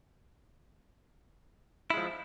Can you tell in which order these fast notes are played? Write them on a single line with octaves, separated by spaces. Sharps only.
E4 G#3 F3